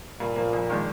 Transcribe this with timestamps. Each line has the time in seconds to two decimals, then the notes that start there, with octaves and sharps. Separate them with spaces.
0.20 G2 A#2
0.36 F3 A#3
0.53 F2
0.70 D#3 G#3 D4